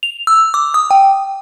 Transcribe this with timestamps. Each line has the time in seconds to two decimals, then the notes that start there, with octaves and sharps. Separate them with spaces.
0.03 F7
0.27 E6
0.54 D6
0.74 D#6
0.91 G5